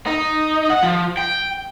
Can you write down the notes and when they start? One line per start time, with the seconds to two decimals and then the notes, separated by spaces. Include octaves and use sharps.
0.07 D#4
0.70 F#5
0.83 F3
1.17 G5